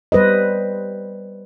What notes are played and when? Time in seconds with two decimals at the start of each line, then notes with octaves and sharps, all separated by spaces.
0.12 G3 B4 C5 D#5